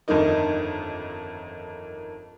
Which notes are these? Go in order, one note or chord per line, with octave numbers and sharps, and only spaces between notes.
G1 F2 D#3 A#3 D#4